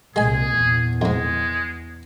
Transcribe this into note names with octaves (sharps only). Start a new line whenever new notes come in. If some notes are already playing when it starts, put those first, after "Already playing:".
C2 A#2 G#3 G#4 G#5
E2
F2 G#2 G#3